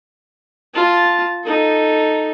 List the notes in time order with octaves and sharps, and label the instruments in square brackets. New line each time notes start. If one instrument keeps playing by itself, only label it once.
[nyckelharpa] F4 A5
D#4 A4